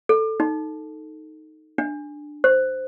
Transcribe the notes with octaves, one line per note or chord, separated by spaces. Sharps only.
A4
D#4
D4
C5